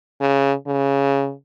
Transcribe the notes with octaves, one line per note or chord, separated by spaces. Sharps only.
C#3
C#3